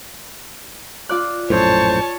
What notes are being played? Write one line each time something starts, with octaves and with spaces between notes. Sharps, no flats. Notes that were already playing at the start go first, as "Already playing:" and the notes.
F4 D5 F#6
A#1 F#2 A2 C5 C#5 A5